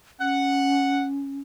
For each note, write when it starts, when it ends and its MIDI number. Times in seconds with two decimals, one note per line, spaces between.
0.20 1.41 61
0.20 1.04 78